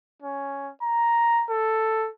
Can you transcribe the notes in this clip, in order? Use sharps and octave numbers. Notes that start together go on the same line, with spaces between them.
C#4
A#5
A4